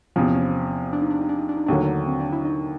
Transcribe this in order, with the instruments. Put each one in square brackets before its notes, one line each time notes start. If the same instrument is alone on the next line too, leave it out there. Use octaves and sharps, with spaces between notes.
[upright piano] E2 C3 F3 [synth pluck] C#4
[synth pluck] C#4
D4
D#4
D4
D#4
D4
D#4
D4
D#4
[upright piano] D#2 D3 F#3 A3 [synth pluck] D4
[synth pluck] C4
D4
E4
D#4